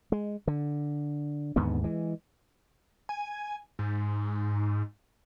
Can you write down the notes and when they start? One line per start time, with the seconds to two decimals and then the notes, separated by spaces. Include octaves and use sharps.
0.12 G#3
0.47 D3
1.56 D#2 G#2 D3 B3
1.84 E3 G#3
3.09 G#5
3.79 G#2